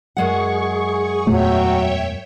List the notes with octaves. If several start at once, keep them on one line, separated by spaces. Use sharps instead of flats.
F#2 G#3 G#4 F#5 C#6
E2 A#2 F#3 A3 C#5 E5 G5